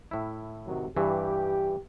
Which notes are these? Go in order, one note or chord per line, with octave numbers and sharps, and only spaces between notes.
A2 E4
C3 D#3 F#3
G2 E3 G4